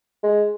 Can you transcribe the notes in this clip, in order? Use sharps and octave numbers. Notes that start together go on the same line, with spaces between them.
G#3